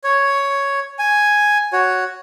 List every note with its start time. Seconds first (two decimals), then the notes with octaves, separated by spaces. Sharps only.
0.04 C#5
0.99 G#5
1.73 F#4 C#5